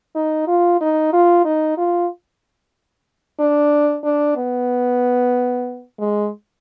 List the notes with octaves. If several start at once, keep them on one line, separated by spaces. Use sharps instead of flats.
D#4
F4
D#4
F4
D#4
F4
D4
D4
B3
G#3